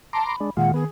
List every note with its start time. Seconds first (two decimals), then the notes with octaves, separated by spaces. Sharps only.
0.13 A5 A#5 C6 D6
0.26 B5
0.40 G#3 D4
0.57 A#2 D#3 G#3 F4 F#5
0.74 B3 G#4